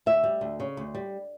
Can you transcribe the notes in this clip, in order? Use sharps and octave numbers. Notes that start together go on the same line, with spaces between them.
D2 E5
G3
D2
C#3
D2
G3